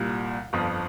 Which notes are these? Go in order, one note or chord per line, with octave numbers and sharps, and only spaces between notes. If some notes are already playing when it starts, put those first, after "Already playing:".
Already playing: C2 A#2 G3
G1 F2 F3